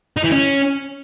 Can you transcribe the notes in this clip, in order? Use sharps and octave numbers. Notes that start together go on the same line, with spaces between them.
D#4
E3
C#4